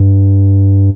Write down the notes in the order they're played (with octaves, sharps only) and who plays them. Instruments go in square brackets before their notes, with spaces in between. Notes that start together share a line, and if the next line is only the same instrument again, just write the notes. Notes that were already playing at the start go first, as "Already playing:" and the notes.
Already playing: [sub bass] G2